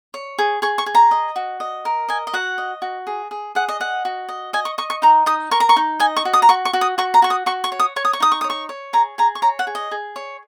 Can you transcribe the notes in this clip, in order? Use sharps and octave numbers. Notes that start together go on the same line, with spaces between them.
C#5
G#4
G#4 C#6
C#6
G#4
A#5
D#5
F#4
D#5
A#4
D#5 G#5
D#5
F#4 F#5
D#5
F#4
G#4
G#4
G#4 F#5
D#5
D#5 F#5
F#4
D#5
D#5 G#5
C#6
D#5 C#6
C#6
D#4 A#5
D#4 D#6
A#4 C#6
A#5
C#6
D#4
D#5 G#5
C#6
F#4
D#6
A#5
F#4 C#6
C#6
F#4
D#6
F#4 C#6
A#5
F#4 C#6
D#6
F#4 C#6
C#6
C#5
D#6
C#5 C#6
D#6
C#6
D#4 D#6
C#6
C#5 D#6
C#6
C#5
G#4 A#5
G#4 A#5
C#6
C#5 A#5
F#5
G#4
D#5
G#4
C#5